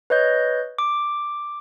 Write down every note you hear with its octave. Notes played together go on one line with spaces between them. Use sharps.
B4 C#5 D#5 G6
D6